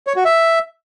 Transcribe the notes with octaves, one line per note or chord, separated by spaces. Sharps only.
C#5
F#4
E5